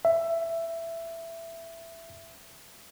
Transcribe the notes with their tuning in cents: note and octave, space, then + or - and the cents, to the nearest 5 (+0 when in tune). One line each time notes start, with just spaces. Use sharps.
E5 +10